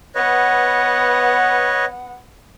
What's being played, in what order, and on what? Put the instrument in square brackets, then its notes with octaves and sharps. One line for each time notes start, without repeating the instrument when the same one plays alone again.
[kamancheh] B3 F#5 [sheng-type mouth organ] B4 C#5 D#5